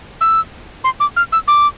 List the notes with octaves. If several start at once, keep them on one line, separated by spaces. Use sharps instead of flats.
E6
C6
D6
F6
E6
D6